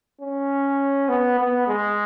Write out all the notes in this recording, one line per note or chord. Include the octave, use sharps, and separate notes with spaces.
C#4
B3
B3
G#3